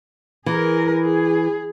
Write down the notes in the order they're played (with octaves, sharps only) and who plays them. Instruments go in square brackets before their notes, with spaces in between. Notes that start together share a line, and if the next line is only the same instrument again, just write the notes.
[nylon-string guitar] E3 [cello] G#4 A#4
[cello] G#4